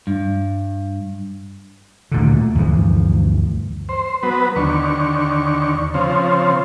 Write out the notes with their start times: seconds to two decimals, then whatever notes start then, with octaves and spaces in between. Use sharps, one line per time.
0.07 G2
2.12 D2 A#2 D3
2.55 D2 G2 E3 F3
3.89 C5
4.23 F#3 B3 B4
4.56 D#2 D3 C#6
5.94 C#3 F3 C4